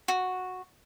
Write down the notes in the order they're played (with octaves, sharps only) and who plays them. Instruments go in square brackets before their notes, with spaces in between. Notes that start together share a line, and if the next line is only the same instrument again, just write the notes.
[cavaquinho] F#4